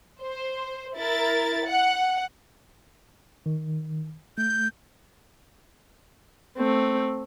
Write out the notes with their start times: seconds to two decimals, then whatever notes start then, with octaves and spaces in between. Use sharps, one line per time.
0.21 C5
0.96 E4 A#4 A6
1.67 F#5
3.46 D#3
4.38 A3 G6
6.57 A3 C4